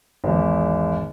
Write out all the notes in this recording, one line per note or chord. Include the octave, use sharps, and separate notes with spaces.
G#1 E2